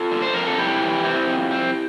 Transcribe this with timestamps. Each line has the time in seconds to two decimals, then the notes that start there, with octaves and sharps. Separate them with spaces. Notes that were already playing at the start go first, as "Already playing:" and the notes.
Already playing: F4 A4
0.11 D3
0.22 C5
0.34 F2 A#4
0.46 A4
0.58 F2 E4 G4
0.81 E3
1.04 C4
1.27 F2
1.51 C4